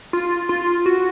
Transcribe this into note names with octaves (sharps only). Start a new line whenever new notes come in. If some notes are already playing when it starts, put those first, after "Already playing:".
F4
F4
F#4